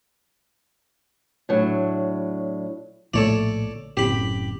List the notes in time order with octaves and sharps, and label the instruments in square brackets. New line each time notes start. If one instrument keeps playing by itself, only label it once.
[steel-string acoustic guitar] A2 F#3 D4
[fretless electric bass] A#1 A2 A3 [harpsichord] A4 C#5 D5
[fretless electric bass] F#1 A2 C4 [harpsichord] G4 B5